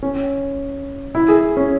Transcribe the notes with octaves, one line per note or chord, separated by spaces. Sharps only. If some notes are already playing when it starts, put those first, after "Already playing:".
C#4
E4
G#4
C#4